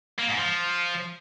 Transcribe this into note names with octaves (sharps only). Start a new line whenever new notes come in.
A#3
G#2
F3